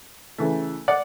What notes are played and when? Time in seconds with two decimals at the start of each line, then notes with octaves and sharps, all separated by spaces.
0.38 C#3 E3 A3
0.88 D5 F#5